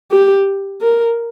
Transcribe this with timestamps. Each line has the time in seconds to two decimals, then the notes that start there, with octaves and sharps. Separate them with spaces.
0.11 G4
0.82 A#4